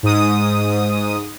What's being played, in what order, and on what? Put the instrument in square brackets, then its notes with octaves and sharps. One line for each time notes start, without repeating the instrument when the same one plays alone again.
[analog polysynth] G#2 D#6